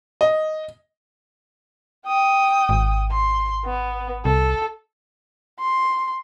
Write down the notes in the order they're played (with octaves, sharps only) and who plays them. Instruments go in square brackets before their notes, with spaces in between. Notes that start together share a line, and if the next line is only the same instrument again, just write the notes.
[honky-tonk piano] D#5
[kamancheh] G5 D#6
[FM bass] G#1
[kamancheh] C6
B3
[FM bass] C2 [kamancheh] A4
[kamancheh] C6